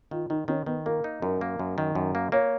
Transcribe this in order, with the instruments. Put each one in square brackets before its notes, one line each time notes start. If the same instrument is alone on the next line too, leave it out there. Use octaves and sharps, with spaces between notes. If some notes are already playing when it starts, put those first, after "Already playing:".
[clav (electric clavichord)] D#3 [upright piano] F4
[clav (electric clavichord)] D#3 [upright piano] D#4
[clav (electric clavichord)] D#3 [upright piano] C#4
[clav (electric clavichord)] D#3 [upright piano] B3
[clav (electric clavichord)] A#3 [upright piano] A#4
[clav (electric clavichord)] D#4
[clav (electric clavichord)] F#2 [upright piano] A#4
[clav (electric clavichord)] A#3
F#2
D#3
F#2
A#3
[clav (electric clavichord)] A#3 [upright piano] C#5